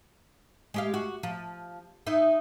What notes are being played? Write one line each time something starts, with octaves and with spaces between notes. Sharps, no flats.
G#3 G4 F5
F#4
F3
D#4 E4